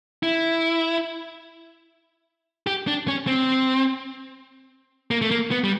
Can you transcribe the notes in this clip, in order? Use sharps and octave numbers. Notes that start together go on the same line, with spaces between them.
E4
G4
D4
C#4
C4
A#3
A3
A#3
B3
G3